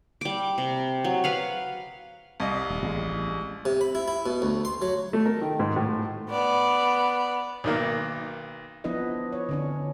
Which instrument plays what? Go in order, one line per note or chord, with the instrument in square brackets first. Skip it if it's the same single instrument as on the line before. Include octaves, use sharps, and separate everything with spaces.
[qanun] G3 D6
C3
F#3
B4 F5 F#5
[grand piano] C2 D#5 F5
[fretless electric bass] D#1
A1 G#3
[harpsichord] C3
B5
E4
E4
B2
D2
C6
F#3
[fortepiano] A3
A#4
D#3
G#2
A2
[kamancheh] B3 D5
[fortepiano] B1 D#3 A#3
[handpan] F3 B3 D4 E4 B4 D#5
C#5
D3 C#4 D4